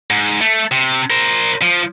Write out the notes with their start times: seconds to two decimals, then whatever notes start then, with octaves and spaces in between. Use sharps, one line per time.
0.10 G#2
0.41 A3
0.71 C3
1.10 A#4 C5
1.62 F3